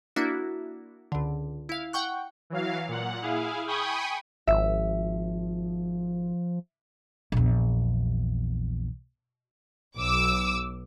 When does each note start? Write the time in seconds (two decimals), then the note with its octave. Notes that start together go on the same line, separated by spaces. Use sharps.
0.16 A#3 D4 E4 F#4
1.12 C#2 D3
1.69 E4 F5
1.93 F#5 G5 C#6 F#6
2.50 E3 F#3 F5
2.88 A#2 F#5
3.22 E4 G#4 F5
3.67 G5 G#5 B5 C#6 D#6
4.47 G#1 F3 E5
7.32 A#1 E2
9.97 B1 D6 E6